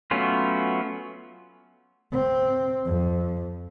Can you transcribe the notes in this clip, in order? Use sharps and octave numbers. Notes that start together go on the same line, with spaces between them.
F#3 A3 B3 C#4 F4
C4
F2